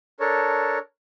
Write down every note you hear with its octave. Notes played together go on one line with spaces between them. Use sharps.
D4 A4 A#4 C#5